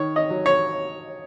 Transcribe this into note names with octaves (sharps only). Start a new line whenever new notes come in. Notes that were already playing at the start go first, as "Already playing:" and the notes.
Already playing: D#3 C#5
D#5
F#3
C#5